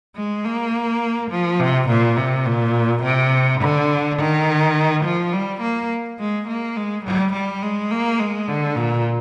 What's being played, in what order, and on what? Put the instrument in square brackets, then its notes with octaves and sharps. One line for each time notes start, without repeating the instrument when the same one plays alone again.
[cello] G#3
A#3
F3
C3
A#2
C3
A#2
C3
D3
D#3
F3
G3
A#3
G#3
A#3
G#3
G3
G3
G#3
A#3
G#3
D3
A#2